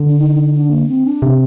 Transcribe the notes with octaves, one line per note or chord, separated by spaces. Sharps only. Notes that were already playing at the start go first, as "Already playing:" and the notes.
Already playing: D3
D4
D#4
D#4
D4
A#3
C4
D4
C3